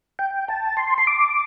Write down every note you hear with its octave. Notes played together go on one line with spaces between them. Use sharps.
G5
A5
C6
C6
D6